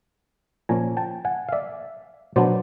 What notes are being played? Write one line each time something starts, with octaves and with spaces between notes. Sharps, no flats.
A#2 F3 A#3 C#4 G#5 A#5
G5 A5
F#5 G#5
F5
D5 E5
B2 F#3 B3 D4 C5 D5